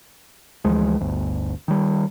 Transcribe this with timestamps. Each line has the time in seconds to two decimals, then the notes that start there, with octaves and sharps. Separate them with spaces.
0.65 D2 E3 F3 G#3
1.01 G1 D2
1.68 D#3 G3